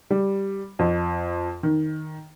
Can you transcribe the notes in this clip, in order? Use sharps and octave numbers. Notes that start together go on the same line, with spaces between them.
G3
F2
D#3